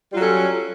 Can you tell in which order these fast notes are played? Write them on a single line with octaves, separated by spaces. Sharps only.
G3 F4 F#3 A4 C#4